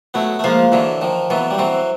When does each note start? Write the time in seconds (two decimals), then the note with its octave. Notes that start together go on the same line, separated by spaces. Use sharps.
0.14 F#3 A3 B3
0.39 A3
0.44 F3 G#3 A#3
0.72 D3 E3 F#3
1.01 D#3 F3
1.30 E3 F#3 B3
1.51 G3
1.58 E3 F#3 C4